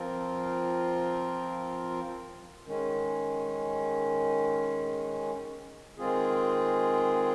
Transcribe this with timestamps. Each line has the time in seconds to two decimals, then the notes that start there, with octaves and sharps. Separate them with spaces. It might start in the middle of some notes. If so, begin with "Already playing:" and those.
Already playing: F3 C4 F4 A#4
2.66 D#3 G#3 C#4
5.98 D#3 G#3 C4 F4 G#4